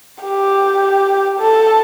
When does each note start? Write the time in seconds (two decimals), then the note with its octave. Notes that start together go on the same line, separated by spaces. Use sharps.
0.23 G4
1.39 A4